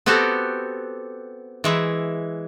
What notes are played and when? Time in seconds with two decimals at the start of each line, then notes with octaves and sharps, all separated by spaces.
0.06 B3 C4 F#4 G4 A4
1.64 E3 G#3 E4